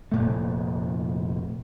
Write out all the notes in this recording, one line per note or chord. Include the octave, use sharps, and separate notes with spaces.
F1 A#2 A3